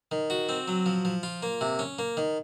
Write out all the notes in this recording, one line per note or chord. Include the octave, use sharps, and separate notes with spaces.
D#3
F#4
C4
F#3
F3
F3
F4
A#3
C3
C#4
A#3
D#3